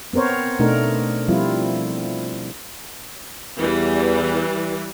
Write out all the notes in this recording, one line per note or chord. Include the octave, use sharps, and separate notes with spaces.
B3 C4 A#4 C5 C#5
B2 A3 D4 D#4 A#4
F3 G3 C4 E4 F4
E2 E3 G3